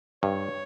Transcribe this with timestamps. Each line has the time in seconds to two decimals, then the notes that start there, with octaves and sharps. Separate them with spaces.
0.23 G2 C#5